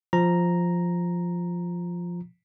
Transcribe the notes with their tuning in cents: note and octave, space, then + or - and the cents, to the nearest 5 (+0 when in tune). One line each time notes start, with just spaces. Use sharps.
F3 +0 A#5 +0